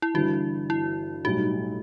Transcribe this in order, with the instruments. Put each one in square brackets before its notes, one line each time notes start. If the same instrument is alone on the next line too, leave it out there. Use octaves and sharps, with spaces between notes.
[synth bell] E4
[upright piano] G1 G2 E3 [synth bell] F#4
[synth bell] E4
[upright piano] B1 A2 G3 D#4 [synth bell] F#4